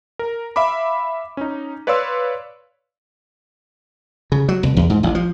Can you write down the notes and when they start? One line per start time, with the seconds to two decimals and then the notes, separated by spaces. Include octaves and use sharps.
0.19 A#4
0.56 E5 F5 B5 D6
1.37 C#4 D#4
1.87 B4 C#5 D5 F5 C6 E6
4.32 C#3
4.49 F#3
4.63 C2
4.77 E2
4.90 G#2
5.03 A1
5.15 F3